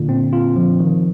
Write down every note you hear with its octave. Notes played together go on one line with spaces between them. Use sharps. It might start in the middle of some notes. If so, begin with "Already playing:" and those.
Already playing: A#2 D3
C4
F4
F3
D#3